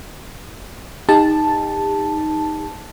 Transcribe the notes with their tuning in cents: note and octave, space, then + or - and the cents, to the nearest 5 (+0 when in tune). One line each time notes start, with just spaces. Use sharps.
D#4 +5 G4 +40 A5 +0